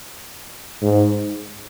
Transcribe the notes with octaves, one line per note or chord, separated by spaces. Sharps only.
G#2